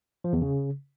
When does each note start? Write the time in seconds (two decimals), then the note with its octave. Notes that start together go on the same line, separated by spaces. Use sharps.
0.24 F3
0.33 E2
0.42 C#3